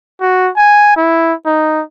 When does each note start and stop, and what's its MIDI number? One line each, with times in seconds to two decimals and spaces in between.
0.21 0.50 66
0.57 0.96 80
0.97 1.33 64
1.46 1.82 63